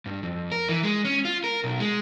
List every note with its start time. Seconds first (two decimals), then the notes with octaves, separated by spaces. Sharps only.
0.06 G2
0.23 F2
0.52 A#4
0.69 E3
0.83 G#3
1.05 C#4
1.25 F4
1.44 A#4
1.64 B1
1.80 G#3